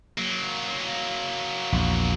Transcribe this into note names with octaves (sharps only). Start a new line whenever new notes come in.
F#3 A#3
A#1 E2